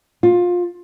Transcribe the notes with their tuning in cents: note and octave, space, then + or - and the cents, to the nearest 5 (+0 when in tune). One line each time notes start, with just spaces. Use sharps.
F4 +20